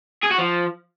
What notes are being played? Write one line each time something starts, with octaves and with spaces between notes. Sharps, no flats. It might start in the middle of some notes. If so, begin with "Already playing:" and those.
G#4
F#4
F3